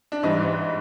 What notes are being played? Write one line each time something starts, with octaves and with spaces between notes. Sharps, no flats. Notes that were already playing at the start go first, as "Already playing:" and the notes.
D4
G#2 E3 G3 D#4